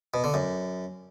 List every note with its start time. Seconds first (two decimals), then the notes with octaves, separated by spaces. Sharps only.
0.14 B2
0.24 D3
0.34 F#2